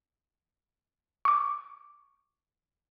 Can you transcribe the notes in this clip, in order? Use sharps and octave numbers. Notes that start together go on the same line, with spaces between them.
C#6 D6